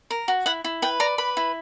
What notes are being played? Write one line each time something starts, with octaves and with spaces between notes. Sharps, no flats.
A#4
F#4
E4 F#5
E4
B4 G5
D5 A#5
B4 B5
E4